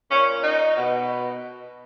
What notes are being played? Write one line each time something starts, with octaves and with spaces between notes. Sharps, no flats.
A#2 C#4
D#4
B2